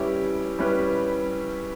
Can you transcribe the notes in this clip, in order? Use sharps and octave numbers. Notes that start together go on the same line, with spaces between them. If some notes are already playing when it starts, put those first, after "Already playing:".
Already playing: G3 C#4 E4 G4 B4
G3 C#4 E4 G4 B4